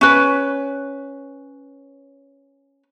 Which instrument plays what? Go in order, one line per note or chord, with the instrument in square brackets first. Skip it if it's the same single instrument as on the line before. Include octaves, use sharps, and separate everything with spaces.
[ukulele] C#4 B4